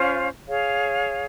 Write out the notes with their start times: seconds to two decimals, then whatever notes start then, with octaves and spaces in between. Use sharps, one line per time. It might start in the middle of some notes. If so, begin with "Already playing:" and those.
Already playing: C#4 F4 C5 F5
0.47 G#4 C#5 F5